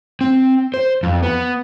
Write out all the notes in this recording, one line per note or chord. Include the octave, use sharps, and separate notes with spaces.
C4
C5
F2
B3